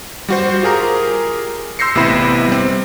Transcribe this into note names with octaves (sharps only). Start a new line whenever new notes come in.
G3 F#4 C5
F4 G4 G#4 A#4 A#5
C6 E6 G6 A#6 C7 C#7
A1 C3 B3 E4 B5 E7
G3 C4